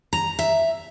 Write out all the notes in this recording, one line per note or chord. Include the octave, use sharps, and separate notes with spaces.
A#5
E5